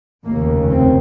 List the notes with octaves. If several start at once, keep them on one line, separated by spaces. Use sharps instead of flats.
F1 D#2 C#3 A#3
C4